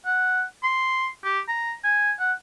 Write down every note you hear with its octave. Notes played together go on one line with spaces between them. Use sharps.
F#5
C6
G4
A#5
G#5
F#5